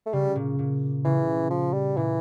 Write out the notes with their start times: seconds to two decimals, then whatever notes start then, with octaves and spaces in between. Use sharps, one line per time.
0.06 A3
0.13 C#3 G3
0.36 A#2
0.59 A#2
1.05 C#3 E3
1.50 F3
1.73 G3
1.97 A#2 E3